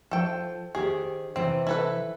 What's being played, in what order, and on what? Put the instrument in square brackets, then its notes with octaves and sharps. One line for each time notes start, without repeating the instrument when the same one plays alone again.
[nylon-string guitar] F3 [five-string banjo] A4 G5
[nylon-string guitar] D#3 G4 C5 [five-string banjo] G#4
[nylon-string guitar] C3 E3 [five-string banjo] C4
[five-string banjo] E4 A4 B4